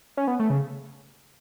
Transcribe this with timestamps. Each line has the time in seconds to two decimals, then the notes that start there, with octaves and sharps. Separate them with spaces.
0.17 C#4
0.27 B3
0.40 A3
0.50 C#3